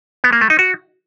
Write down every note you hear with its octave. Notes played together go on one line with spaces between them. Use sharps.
B3
A#3
A3
D#4
F#4